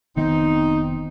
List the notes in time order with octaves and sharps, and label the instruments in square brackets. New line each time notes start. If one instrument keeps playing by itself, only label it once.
[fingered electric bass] F1 D#3 B3 [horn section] C4 D#4